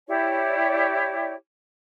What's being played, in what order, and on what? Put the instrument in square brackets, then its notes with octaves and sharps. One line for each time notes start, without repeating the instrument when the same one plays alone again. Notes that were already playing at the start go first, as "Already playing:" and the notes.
[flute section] E4 G4 C#5 D5